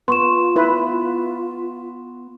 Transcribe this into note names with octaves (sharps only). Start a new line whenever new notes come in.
B3 F4 C6 C#6 E7
E4 B4